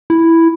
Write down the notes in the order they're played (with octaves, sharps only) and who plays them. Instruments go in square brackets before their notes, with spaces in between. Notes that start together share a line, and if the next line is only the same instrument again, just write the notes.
[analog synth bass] E4